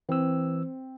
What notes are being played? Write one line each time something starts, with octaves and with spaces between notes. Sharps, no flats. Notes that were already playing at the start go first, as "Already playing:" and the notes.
E3 C4 E6